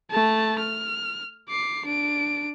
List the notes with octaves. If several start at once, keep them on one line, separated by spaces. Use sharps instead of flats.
A3 A5
F6
D6 C7
D4 D7